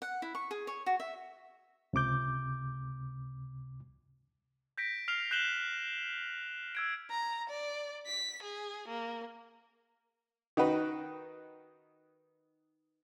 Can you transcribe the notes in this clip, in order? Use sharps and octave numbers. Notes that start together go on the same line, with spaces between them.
F#5
E4
C#6
G#4
C#5
F#4
E5
C#2 C3 D6 G6
G6 A#6 B6 D7
F6 C7 F7
F#6 G6 C7 E7 F#7 G7
E6 G#6 D7
A#5
D5
B6
G#4
A#3
D#3 D#4 F#4 B4